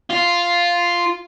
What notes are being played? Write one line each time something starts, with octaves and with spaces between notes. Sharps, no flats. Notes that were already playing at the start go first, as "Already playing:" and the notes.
F4